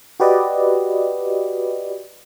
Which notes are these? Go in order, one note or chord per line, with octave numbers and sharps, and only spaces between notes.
F#4 G4 B4 D5 D#5